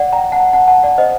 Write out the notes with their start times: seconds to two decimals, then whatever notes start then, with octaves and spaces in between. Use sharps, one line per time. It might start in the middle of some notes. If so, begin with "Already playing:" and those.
Already playing: D5 F#5
0.13 G5 A#5
0.32 F#5 A5
0.53 F#5 A5
0.68 F#5 A5
0.83 D5 F#5
0.98 C5 D#5